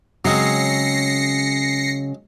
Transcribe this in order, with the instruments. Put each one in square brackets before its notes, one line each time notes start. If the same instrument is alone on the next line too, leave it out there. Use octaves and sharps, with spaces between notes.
[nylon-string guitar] C#3 [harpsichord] F#3 G#3 C4 [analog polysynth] A#6 C7 C#7